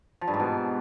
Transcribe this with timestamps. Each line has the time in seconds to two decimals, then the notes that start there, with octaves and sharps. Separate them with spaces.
0.21 F3
0.28 G2
0.34 G#2
0.40 B2